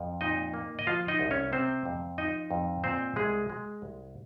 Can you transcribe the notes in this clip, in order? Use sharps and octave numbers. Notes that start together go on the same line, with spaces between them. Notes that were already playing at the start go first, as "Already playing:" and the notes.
Already playing: F2 F3
A#2 D#4 D#5
A#3
D#5
F3 F4 F5
D#4 D#5
C2
C#4 C#5
C3 C4 C5
F2
F3 D#4 D#5
F2
A#2 C4 C5
C2 G#3 G#4
G#3
C2